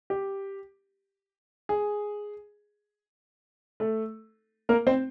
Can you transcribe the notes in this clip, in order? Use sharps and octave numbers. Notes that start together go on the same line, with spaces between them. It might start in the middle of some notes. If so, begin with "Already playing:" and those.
G4
G#4
A3 A4
A#3 A#4
C4 C5